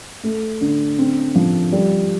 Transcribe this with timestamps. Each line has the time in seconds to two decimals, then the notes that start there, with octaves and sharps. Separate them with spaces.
0.23 A3
0.61 D3
0.98 C4
1.35 F3
1.72 G3